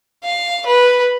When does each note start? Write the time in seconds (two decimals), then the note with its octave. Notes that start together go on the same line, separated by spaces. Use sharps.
0.24 F5
0.66 B4